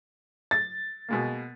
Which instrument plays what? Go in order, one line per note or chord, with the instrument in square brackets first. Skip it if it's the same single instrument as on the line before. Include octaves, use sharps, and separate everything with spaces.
[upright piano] A6
[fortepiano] B2 G#3 A#3